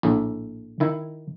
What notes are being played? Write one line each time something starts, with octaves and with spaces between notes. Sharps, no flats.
A#1 A2
D#3 E4